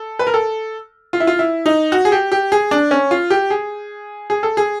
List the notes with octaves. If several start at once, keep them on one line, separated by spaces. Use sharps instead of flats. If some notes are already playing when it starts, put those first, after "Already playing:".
Already playing: A4
B4
A#4
A4
F4
E4
F4
E4
D#4
F#4
G#4
G4
G4
G#4
D4
C#4
F4
G4
G#4
G#4
A4
G#4